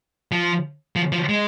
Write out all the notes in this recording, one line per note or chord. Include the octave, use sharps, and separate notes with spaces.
F3
F3
F3
G#3